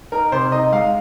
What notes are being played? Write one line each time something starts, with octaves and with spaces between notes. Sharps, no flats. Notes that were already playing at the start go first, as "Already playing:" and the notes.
D#4 A#4
C3 C5
D#4 D#5
G#3 F5